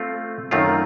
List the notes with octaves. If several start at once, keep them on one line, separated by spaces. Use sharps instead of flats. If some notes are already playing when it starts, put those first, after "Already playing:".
Already playing: A3 C4 F4
F#2 D#3 A3 C4 F4